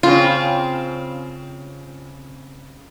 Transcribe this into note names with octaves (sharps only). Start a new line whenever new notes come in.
C#3 C4 F4